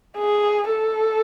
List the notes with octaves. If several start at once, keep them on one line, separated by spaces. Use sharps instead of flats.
G#4
A4